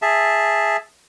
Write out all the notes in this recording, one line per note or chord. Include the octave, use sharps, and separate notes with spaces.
G#4 E5 A5